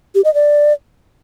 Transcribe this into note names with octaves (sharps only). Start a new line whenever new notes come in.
G4
D#5
D5